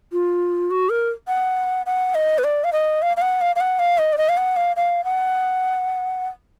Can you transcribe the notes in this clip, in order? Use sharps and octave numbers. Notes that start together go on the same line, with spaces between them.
F4
F#4
A#4
F#5
F#5
D#5
B4
D5
F5
D#5
F5
F5
F#5
F5
F5
F#5
F5
D#5
D5
D#5
F5
F#5
F5
F5
F#5